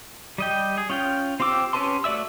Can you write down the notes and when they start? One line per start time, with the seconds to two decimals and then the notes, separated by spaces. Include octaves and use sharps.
0.38 G3 D#5 G5
0.78 G#4
0.90 C#4 F4 G5
1.40 C4 F4 G4 D6 E6
1.73 C#4 G4 B4 A5 C6
2.04 A3 F#4 D5 E5 E6